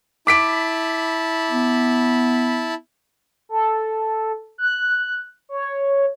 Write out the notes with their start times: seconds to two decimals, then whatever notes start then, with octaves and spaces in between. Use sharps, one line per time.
0.27 E4 A5 B5 D6 B6 D7
1.50 B3
3.49 A4
4.58 F#6
5.49 C#5